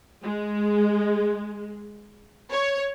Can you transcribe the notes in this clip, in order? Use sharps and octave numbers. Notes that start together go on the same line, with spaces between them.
G#3
C#5